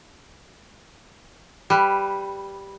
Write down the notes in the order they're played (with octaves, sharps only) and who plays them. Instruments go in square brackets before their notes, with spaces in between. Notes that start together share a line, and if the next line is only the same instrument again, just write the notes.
[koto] G3 B4